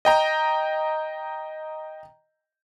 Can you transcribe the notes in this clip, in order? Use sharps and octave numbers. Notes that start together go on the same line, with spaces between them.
D#5 G5 A#5